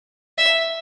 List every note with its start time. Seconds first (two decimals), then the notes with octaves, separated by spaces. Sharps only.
0.38 E5